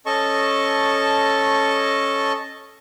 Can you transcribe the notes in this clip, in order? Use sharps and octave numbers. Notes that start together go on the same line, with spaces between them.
C#4 A4 D#5 A5 C#6